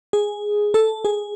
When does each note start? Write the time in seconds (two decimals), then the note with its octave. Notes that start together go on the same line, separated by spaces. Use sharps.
0.13 G#4
0.74 A4
1.05 G#4